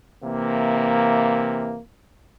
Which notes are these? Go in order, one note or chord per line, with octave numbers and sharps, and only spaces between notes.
C3 E3 A#3